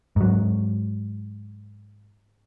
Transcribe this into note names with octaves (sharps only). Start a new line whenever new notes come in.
G#2 F#3